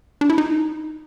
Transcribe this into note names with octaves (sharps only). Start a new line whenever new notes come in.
D4
E4
D#4